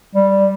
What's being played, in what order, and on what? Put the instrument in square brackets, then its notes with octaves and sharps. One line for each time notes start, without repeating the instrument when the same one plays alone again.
[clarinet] G3